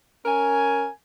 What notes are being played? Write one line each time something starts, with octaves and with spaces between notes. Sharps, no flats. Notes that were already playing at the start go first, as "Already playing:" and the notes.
C#4 A#4 G#5